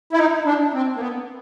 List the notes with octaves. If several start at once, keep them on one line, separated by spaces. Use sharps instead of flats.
E4
D#4
D4
C4
A#3
B3